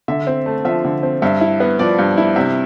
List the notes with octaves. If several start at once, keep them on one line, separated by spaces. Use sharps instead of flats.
D3 E5
C4
A3
F3 E5
D3
C4
G2 E5
E4
B3
F3 D5
G2
E4
C3 E5